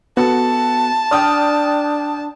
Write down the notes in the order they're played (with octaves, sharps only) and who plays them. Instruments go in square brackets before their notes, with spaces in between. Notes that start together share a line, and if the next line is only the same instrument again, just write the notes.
[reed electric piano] B3 [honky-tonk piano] F#4 A4 [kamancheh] A5
[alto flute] D4 [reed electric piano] D5 [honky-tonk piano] G5 D#6 F6